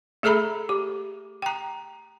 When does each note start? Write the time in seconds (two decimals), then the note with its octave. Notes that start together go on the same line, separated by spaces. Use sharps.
0.23 A3 G#4 A4 E5 A#5 B5
0.69 G4
1.42 G5 A#5